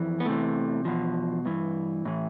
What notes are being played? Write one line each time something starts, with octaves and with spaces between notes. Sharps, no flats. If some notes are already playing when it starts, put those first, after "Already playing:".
Already playing: F2 E3
B3
E2 C3 E3 A3
E2 B2 F3
G2 E3
A2 E3